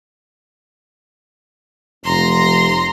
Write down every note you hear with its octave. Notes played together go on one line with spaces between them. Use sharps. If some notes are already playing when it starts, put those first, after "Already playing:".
F1 A#5 C6